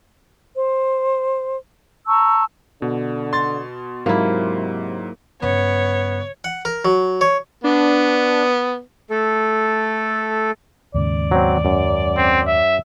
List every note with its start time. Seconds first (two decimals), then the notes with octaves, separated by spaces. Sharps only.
0.56 C5
2.08 A5 A#5 C#6 E6
2.82 B2 D3
3.33 C6 A6
4.06 G#2 C3 F#3 A#3 E4
5.42 G2 C#3 B3 C#5
6.44 F#5
6.65 A#4
6.85 F#3
7.21 C#5
7.64 B3 D4
9.10 A3 A4
10.95 D#2 G#2 C#3 D5
11.31 F#3 C4
11.65 F#2
12.17 C4
12.47 E5